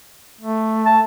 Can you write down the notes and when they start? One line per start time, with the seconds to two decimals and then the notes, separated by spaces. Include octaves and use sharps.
0.41 A3
0.86 A5